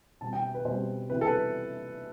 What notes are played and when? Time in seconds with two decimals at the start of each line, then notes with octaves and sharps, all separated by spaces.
0.21 B2 G3 C4 A5
0.33 G5
0.55 B4
0.65 B2 G3 C4 C5
1.10 C3 E3 B3 B4
1.21 A4
1.27 B4